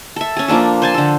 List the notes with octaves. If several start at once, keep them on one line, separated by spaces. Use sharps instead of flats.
A4 E5
C#4 G#4
F3 A#3 D4 A4
C5 G#5 A5
D3 A4